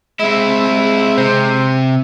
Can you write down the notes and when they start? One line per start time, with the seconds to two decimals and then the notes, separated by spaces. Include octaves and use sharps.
0.20 G#3 C4 E4 E5
0.71 G#3
1.17 C3 C5